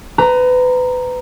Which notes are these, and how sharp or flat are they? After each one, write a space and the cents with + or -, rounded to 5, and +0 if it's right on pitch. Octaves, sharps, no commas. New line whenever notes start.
B4 +30 A#5 +0